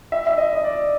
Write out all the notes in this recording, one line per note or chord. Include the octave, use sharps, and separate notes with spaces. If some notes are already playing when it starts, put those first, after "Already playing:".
E5
E5
D#5
D#5
D5